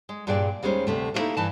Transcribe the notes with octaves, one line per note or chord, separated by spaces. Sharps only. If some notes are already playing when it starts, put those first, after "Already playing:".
G#3
G2 A#2 D4 G#4 D5 G5
D#2 G3 G#3 C#4 C5
D2 C3 A3
G3 A3 A#3 D#4 E4 A4
G2 E3 A5